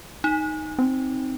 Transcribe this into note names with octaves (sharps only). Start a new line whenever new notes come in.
D#4
C4